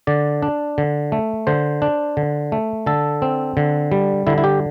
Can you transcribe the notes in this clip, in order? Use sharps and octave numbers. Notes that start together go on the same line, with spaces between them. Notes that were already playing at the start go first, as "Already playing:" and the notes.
D3 D5
D4
D3
A3
D3 C5
D4
D3
A3
D3 A4
C4
D3
G3
D3 E4
E4
G4